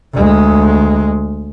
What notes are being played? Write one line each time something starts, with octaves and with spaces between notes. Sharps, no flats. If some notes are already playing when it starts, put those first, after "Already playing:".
D2 G#3